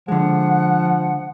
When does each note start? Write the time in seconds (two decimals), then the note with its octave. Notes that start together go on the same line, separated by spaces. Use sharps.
0.08 D3 F3 G#3 F#5